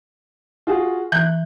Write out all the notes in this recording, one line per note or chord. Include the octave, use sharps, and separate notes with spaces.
F4 F#4 G#4
E3 F#6 G6